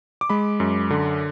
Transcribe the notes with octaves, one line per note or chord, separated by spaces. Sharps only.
D6
G#3 B5
F#2
D3